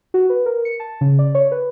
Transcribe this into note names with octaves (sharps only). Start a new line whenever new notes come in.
F#4
B4
A#4
C#7
A5
C#3
D5
C#5
B4